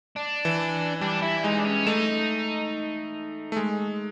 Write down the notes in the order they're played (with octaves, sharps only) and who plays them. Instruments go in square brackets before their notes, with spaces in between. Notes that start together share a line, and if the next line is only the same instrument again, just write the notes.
[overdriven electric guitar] D4
[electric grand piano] E3
[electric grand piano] G3 [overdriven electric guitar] D4
[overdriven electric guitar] E4
[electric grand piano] G#3 [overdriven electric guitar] D#4
[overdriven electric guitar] D4
C#4
[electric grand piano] A3 [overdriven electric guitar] D#4
[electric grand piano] A3
G#3